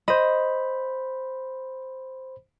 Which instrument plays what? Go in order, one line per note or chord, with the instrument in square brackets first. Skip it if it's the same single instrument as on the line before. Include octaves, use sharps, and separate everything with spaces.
[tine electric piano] C5 B5 [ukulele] D#5